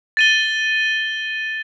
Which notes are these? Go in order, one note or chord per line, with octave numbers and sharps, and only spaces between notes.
A6 D#7 G7